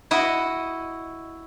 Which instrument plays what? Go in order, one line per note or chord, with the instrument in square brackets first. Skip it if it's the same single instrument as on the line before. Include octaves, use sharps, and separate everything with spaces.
[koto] E4 F#4 D#5